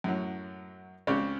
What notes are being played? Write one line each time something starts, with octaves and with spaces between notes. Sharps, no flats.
F#2 A2 F#3
C#2 C#3 C4 C#5 D5